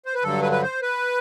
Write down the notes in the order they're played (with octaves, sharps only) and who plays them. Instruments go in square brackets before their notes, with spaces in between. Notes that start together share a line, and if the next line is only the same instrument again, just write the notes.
[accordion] C5
B4
G2 D3 F#3 A4
B4
B4
C5
B4